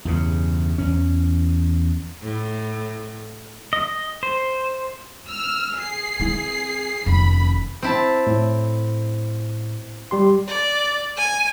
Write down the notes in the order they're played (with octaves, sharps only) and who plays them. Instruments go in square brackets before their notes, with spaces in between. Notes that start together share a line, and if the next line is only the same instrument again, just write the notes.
[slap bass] E2 G2 C#3
E2 C#4
[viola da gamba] A2
[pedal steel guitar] D#5
C5
[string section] E6 F6
G#4 C7
[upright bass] C4 E4
[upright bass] F1 C#4 [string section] D#2 B5
[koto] C4 E4 A5
[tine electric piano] A2
G3 G4 C6
[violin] D5
G#5